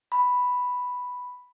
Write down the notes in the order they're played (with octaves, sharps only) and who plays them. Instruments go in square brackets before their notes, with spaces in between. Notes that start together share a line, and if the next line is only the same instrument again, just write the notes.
[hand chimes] B5